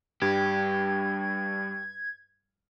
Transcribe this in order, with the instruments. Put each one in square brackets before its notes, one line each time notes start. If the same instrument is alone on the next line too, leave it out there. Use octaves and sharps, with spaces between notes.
[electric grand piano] G2 G3 [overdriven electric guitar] G4 [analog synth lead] G#6